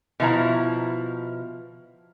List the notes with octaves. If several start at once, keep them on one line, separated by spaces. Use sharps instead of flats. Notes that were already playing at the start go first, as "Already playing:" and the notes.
B2 F3 E4 A#5